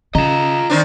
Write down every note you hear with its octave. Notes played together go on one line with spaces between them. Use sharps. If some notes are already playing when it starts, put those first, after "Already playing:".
C#3 F4 D#5 A#5
D#3 C4 D4